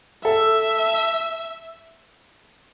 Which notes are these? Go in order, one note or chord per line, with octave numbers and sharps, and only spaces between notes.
A4 E5